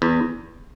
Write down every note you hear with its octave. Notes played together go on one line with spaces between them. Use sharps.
E2